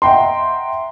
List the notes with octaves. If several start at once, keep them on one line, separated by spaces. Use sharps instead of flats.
D#5 E5 F#5 G5 A#5 C6